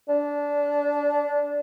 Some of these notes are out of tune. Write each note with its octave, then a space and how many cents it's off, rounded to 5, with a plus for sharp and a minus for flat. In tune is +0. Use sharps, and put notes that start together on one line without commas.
D4 -15